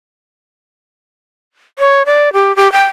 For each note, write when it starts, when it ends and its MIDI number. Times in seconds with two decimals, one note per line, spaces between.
1.79 2.03 73
2.06 2.33 74
2.33 2.55 67
2.56 2.71 67
2.72 2.84 79